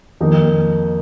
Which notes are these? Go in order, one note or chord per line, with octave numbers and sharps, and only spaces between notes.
F2 D#3 A#3 D#4